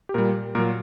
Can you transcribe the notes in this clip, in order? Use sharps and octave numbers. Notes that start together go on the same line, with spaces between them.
G4
A#2 G3 A#4
A#2 F#3 A#4